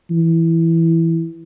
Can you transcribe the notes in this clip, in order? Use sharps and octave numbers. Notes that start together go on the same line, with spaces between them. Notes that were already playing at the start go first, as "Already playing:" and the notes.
E3